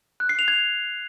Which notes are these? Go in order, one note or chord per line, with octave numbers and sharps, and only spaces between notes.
F#6
C7
F7
G#6